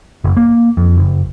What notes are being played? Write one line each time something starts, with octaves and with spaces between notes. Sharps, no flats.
F#1
A#3
F2
F#1